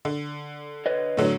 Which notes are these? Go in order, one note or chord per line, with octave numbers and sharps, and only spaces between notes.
D3
B4 C#5 D#5
A2 D3 F#3